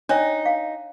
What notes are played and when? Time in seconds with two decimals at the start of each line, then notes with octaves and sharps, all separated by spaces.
0.09 D4 D#4 C#5 G5
0.45 F5